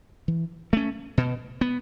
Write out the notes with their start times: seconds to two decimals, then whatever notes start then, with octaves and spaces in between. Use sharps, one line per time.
0.28 E3
0.73 A3 C#4
1.18 B2
1.61 B3